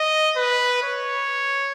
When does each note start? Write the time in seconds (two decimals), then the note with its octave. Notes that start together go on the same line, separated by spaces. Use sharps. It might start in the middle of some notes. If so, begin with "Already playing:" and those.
Already playing: D#5
0.36 B4
0.83 C#5